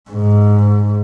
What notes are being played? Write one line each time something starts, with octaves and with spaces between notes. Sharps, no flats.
G#2